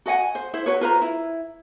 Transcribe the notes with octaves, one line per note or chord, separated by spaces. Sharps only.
F#4 D#5 F#5 G#5
C5
E4 C5
F#4 B4 C#5
F4 B4 C5 A#5
E4